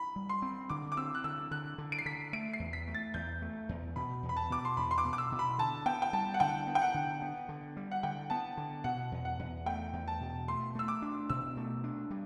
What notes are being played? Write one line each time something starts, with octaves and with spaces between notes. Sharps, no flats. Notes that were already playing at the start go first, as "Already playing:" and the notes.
Already playing: B5
G3
C6
C4
D3 D6
D6
C4 E6
F#6
D3 E6
D3 F#6
D3
D7
C7
D3 B6
A3 D7
C7
E2
B6
A3
A6
E2 G6
A3
E2
B2 B5
E2
B5
A5
B2 D6
C6
E2 B5
C6
D6
B2
D6
E6
B2
B5
D3 A5
B3 G5
G5
G3 A5
F#5
D3 G5
B3
G5
F#5
D3
B3
D3
G3
F#5
D3 G5
B3 A5
D3
B2 F#5
E2
F#5
E2
A3 G5
E2
A5
B2
A3 C6
A3 E6
D6
D4
B2 E6
A3
D4
G3